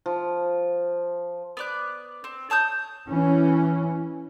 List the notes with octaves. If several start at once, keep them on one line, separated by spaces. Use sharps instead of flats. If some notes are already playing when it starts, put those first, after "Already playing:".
F3
B3 D5 F#6
C4
C#5 A5 D#6 G6
E3 C#4